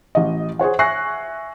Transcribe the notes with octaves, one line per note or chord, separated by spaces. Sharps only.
A1 D#5
G#4 C5 C#5 F#5
E5 G#5 C#6 F#6 A#6 C7